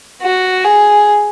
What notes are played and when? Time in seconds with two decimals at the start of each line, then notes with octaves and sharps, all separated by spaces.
0.22 F#4
0.64 G#4